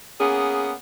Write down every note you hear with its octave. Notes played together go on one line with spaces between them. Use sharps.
A#3 B3 C#4 G#4